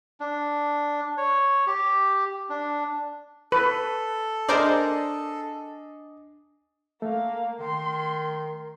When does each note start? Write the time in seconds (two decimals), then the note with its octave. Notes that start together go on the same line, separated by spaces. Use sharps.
0.20 D4
1.18 C#5
1.67 G4
2.50 D4
3.52 A4 B4
4.49 D4 G#4 A#4 C5 D5 D#5
7.02 A3 A#3 F5
7.60 D#3 C6